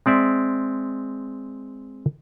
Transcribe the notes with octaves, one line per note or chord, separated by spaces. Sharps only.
G#3 C4 D5 E5